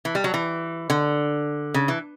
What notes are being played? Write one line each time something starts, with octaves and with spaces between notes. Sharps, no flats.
E3
G3
F#3
E3
D3
C#3
E3